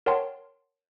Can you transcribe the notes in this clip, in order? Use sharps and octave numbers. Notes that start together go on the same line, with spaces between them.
A#4 C#5 F#5 G5 A5 C6